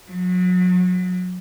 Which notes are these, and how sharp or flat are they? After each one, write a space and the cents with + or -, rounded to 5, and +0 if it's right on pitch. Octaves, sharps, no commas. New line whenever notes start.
F#3 -30